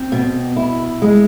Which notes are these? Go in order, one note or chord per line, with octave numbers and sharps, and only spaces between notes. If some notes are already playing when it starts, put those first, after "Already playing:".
Already playing: C4
B2
E4
G#3